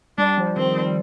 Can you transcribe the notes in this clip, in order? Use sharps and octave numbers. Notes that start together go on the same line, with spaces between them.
G3 D4
F3
D#3 C4
F3
G3
G3